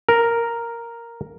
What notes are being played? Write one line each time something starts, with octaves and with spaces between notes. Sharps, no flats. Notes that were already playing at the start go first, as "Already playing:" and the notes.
A#4